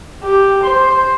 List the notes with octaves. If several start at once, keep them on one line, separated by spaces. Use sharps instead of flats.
G4
C5